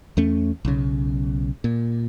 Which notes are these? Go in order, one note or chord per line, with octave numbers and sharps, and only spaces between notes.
E2 A3 C#4
B1 C#3
A#2